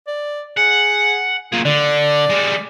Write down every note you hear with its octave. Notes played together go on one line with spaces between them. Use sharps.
D5
G#4 F#5
A#3 F4 G#4
D3 D5
G3 G#3